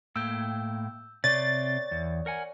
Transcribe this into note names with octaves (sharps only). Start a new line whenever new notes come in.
A2 A#3 G5 E6 G6
C3 C4 C#5 D5 A6
E2
A#4 F#5 G#5